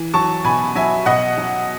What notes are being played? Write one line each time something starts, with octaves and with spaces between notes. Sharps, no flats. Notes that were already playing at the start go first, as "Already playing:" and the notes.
Already playing: E3
F#3 A5 C#6
B2 G#5 B5
F#3 E5 G#5
B2 D#5 F#5
F#3